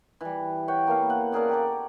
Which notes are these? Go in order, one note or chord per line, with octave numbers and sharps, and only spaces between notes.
E3 G3
C#5 F#5 G5
A#3 B3 A4 F5
F#5
C#3 G#4 A#4 D5
G4 A4 D5